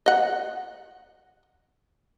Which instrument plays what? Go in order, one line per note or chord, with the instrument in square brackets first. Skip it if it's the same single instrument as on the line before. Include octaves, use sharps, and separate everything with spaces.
[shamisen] D#5 F#5